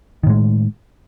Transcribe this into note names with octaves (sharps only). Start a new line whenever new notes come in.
A2 D#3 G#3